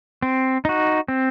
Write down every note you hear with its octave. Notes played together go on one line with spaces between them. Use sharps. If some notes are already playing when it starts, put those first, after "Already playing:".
C4
D#4 F#4
C4